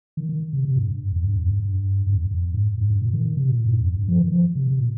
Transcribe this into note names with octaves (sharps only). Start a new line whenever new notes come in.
D#3
D#3
C3
C3
G2
G2
F2
G2
F2
G2
G2
G2
F2
F2
G#2
G#2
G2
A#2
D#3
D#3
C3
A#2
G2
F2
G2
F3
D#3
F3
C3
C3
A#2